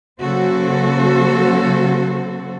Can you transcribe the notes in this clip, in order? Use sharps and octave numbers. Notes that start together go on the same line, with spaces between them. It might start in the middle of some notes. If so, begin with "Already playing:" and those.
C#3 F#3 A#3 F#4 A4 C5